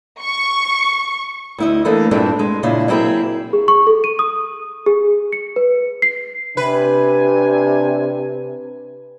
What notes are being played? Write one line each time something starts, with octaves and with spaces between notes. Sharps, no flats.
C#6
D2 E4 D#5
E3 A3 A#3 D4
G2 A#2 G#3 C4 D4 E4
G#3
A#2 C#3 D4 E4 D#5 F5
F#3 A#3 C4 E4 G#4
G#4
C#6
A4
D#7
D#6
G#4
C#7
B4
C7
C3 D4 B4 G#5